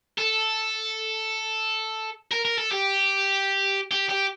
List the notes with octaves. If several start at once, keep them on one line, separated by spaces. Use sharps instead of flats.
A4
A#4
A#4
A4
G4
G4
G4